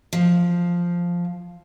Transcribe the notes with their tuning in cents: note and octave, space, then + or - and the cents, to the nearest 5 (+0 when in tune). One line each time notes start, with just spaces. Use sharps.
F3 +0